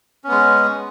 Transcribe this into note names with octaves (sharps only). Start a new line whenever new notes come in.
G#3 B3 C#4